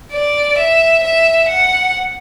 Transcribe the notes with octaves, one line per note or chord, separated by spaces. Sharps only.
D5
E5
E5
F#5